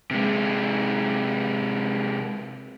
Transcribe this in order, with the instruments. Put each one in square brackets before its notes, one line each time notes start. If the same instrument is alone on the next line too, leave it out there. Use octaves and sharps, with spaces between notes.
[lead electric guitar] C3 G#3